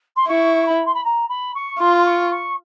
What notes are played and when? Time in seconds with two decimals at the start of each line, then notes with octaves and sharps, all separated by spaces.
0.16 C6
0.28 E4 C#6
0.66 B5
0.85 C6
0.94 B5
1.04 A#5
1.28 B5
1.54 C#6
1.79 F4 C6
1.97 C6
2.05 C#6
2.30 C#6